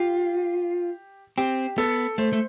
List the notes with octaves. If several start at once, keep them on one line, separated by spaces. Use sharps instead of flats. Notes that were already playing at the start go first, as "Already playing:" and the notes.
Already playing: F4 G4
C4 G4
B3 A4
A3 C5
A3